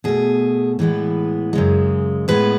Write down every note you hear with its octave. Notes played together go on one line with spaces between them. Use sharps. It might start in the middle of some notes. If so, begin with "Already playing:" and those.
B2 A3 G#4
A2 E3 G#3 B3
F#2 C#3 G#3
A2 G#3 B3 B4